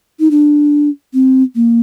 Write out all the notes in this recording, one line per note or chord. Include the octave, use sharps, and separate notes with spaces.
D#4
D4
C4
A#3